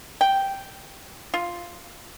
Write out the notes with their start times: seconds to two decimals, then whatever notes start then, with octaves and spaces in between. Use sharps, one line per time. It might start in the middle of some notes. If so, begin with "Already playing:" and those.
0.21 G5
1.34 F4